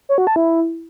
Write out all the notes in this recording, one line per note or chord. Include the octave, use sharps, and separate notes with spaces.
C#5
F#4
A5
E4